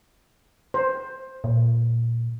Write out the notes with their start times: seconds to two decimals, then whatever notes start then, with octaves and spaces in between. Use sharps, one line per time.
0.74 C5
1.44 A#2